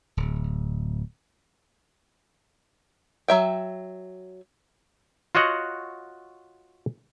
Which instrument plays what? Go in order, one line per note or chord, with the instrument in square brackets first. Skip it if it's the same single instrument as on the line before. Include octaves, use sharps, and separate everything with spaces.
[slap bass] D1
[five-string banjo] F#3 E5 G5
[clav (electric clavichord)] F4 F#4 C#5 D#5 F#5